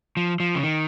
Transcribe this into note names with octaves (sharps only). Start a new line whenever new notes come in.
F3
F3
C#3
D#3